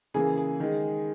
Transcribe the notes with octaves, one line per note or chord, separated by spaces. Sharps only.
C#3 E3 A#3 G#4
G#4
D#3 G#3